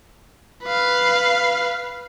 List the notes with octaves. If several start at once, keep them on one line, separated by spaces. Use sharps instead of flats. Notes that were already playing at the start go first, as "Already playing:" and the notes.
B4 F5